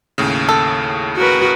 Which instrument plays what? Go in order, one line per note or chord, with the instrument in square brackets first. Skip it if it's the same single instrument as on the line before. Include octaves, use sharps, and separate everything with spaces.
[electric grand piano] D#2 A2 C#3
[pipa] A4
[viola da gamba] F#4 A#4 B4